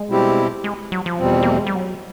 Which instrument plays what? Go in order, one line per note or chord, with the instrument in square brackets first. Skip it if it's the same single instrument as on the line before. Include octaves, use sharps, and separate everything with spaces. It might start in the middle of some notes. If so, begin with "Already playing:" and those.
Already playing: [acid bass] G#3
[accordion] B2 G3 C4 E4 G4
[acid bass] G#3
F#3
F3
[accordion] E2 B2 G3 C4
[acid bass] A#3
A3
G#3
G3
F#3